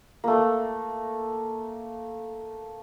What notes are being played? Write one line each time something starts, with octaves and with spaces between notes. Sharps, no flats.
A3 A#3